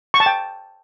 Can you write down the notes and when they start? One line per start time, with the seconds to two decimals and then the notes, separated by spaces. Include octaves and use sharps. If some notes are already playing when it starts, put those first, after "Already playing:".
0.14 C#6
0.20 A5
0.26 G5